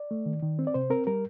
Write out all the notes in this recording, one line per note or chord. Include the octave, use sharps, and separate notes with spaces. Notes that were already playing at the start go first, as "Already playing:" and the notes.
Already playing: D5
A3
D#3
D#3
C4
D5
C3 C5
C4 A#4
G3 A#4